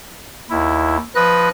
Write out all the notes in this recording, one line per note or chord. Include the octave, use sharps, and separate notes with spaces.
D#2 E4
F3 B4 D#5 F#6